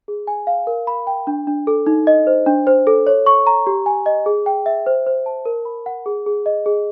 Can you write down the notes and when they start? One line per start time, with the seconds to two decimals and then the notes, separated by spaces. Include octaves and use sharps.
0.08 G#4
0.27 G#5
0.47 F5
0.67 A#4
0.87 B5
1.07 G5
1.27 D4
1.47 D4
1.67 A4
1.86 D#4
2.07 D#5
2.27 C5
2.46 D4
2.67 C5
2.87 A4
3.07 C#5
3.26 C#6
3.47 A#5
3.67 G4
3.86 G#5
4.06 D#5
4.26 G#4
4.46 G5
4.66 E5
4.86 C5
5.07 C5
5.26 A5
5.45 A#4
5.65 B5
5.86 F#5
6.06 G#4
6.26 G#4
6.46 D#5
6.66 G#4